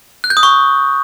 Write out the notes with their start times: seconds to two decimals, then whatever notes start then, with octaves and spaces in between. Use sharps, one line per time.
0.24 F#6
0.30 G6
0.37 D#6
0.43 C#6